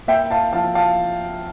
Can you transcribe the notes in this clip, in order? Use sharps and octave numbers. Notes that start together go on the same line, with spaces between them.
A#3 E5 G5
F5 A5
F3 F5 A5
F5 A5